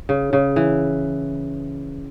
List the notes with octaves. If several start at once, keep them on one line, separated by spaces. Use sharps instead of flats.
C#3
C#3
E3